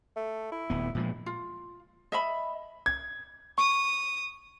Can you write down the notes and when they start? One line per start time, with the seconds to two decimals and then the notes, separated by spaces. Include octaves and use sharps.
0.16 A3
0.52 E4
0.70 D1 B3
0.95 A#2 F3 G#3
1.26 F4
2.12 D#5 E5 B5
2.86 G#6
3.58 C#6 D#6